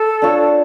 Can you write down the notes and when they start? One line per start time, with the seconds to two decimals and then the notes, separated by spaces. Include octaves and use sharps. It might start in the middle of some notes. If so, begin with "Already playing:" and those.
Already playing: A4
0.22 D4 F4 C#5